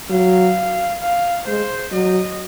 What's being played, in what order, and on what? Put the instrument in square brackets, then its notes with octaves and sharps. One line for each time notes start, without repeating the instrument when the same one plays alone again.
[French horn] F#3 [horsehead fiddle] F5
[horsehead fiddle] F5
[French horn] G#3 [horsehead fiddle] C5
[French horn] F#3 [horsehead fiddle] D#5